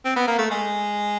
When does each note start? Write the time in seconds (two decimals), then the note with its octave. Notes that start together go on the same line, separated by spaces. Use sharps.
0.05 C4
0.16 B3
0.27 A#3
0.38 A3
0.51 G#3